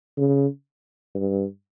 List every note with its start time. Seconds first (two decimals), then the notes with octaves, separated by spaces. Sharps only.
0.17 C#3
1.15 G2